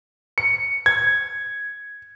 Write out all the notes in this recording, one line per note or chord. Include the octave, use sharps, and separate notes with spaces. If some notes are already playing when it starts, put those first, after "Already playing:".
C#7
G#6